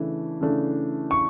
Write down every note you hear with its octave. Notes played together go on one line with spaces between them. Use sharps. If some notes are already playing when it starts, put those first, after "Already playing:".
Already playing: C#3 E3 A3 D4
C#3 E3 A3 D4
C#6